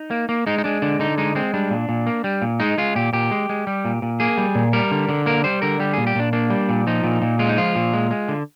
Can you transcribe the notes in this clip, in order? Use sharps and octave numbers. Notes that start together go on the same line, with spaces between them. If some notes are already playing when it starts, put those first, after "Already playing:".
Already playing: D#4
A#3
A#3
G#3 D#4
D#4
G#3 D4
D3 D4
D3 D#4
G#3 D#4
G#3 C4
G3 D4
A#2
A#2
A#3
G3
A#2
G#3 D#4
G#3 F4
A#2 G4
A#2 G4
G#3
G#3
G3
A#2
A#2
A#3 G#4
G3
A#2
G3 A#4
D3
D3
A#3 A#4
G3 C5
D3 A#4
G3 G4
A#2 G#4
G4
A#2 D4
A#3 D4
G3
A#2
F3 D#4
A#2
A#2
G#3 F4
D#4
F3 F4
A#2
G#3
G#3
D3